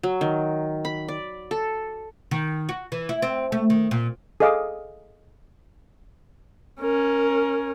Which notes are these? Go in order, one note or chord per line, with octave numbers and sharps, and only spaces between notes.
F#3
D#3
B5
D5
A4
D#3
F#4
E3
E4
C4
A3
D#3
A#2
G#4 A4 D#5 F5 D6
C#4 A#4